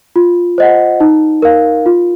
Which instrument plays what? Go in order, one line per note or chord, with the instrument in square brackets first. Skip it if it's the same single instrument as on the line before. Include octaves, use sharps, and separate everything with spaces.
[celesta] F4
C5 D#5 F#5
D#4
A#4 F5
F4